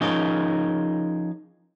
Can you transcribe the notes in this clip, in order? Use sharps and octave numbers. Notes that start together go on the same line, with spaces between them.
F3 C#4 D#4 G#4 A#4